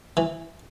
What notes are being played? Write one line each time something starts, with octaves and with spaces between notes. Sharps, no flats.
E3